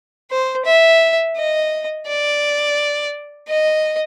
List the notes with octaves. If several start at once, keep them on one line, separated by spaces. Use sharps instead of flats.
C5
E5
D#5
D5
D#5